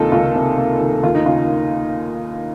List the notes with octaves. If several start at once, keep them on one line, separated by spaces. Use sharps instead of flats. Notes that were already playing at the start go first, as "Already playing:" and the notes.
Already playing: C#2 C3 D#3 A#3 D#4 F4 A4
C#2 F4
C3
A#3
D#3
D#2 F4
D#4
C#3 F4